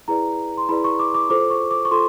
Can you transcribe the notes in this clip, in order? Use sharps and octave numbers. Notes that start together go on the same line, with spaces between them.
E4 G#4 B4 D5 A#5
C6
E4 G#4 B4 D5 B5
C#6
D6
D6
F4 A4 C5 D6
C#6
D6
C#6
F4 A4 C6